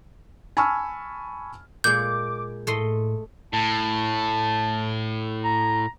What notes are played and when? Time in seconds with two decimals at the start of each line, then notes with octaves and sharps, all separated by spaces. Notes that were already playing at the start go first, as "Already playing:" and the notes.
0.57 G#5 A5 B5 C#6 E6 F6
1.84 A#2 G#3 D6 G6
2.67 A2 A3 D#5 C6
3.53 A2 A5
5.44 A#5